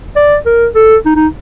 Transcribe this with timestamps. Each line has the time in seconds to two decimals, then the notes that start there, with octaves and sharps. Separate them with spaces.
0.16 D5
0.46 A#4
0.75 A4
1.06 D#4
1.16 D#4